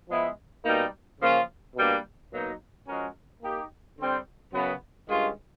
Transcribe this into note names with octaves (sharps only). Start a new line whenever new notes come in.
F3 G#3 B3 E4
B2 G3 A#3 D#4
C#3 F3 A#3 C#4 F4
B2 G3 A#3 D4
B2 F#3 A#3 D#4
F3 G#3 C#4 F#4 A#4
A#3 D#4 G4
D3 G3 C4
F#2 C#3 F#3 B3
G2 D#3 G#3 C#4 F4